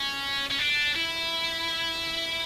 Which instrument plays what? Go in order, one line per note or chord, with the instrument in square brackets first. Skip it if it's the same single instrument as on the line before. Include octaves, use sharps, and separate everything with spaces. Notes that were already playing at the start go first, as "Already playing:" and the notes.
Already playing: [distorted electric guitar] C#4
C#4
D4
E4